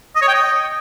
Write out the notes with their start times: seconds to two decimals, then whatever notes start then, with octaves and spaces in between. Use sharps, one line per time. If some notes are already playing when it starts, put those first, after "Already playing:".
0.16 D#5
0.22 C#5
0.28 G5
0.34 D#5